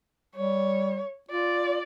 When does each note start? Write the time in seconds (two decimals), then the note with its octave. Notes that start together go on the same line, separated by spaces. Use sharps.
0.36 G3 C#5
1.30 F4 D5